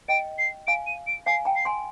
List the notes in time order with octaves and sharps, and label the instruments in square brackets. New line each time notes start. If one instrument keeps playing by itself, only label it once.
[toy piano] D#5 G5 [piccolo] D7
[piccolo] C7
[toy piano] F5 G#5 [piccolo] D7
[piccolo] D#7
D7
[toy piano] F5 G#5 [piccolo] C7
[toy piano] G5 A#5
[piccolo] C7
[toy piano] G#5 C6